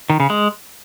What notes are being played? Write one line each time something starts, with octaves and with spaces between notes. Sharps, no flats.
D#3
C#3
G#3